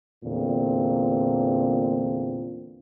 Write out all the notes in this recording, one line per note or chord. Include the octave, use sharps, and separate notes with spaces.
E2 A#2 D3 C4